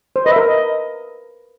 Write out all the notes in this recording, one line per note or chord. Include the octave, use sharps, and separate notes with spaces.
C5
B4 D#5
E5
A#4
D#5